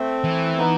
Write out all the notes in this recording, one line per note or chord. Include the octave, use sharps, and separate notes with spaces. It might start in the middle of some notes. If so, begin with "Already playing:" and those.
Already playing: A3 C4
E3
B3 D#4